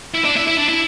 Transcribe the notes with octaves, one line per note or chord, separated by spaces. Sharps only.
E4
D4
E4
E4
D4
E4